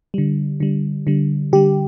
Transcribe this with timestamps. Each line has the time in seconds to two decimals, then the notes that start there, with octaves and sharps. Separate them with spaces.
0.14 D3 G3
0.60 D3 G3
1.07 D3 G3
1.53 D3 G3 G4